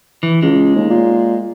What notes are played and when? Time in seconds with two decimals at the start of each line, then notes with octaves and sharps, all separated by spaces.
0.23 E3
0.42 C#2 G#3
0.76 D#2
0.90 A#2